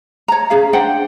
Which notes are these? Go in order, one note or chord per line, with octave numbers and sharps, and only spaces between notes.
C#5 A#5
C#4 G#4 F5
D4 C5 F#5 G5